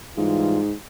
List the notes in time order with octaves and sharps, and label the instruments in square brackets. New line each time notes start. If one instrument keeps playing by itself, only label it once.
[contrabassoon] G#2 [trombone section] E3 G3 F4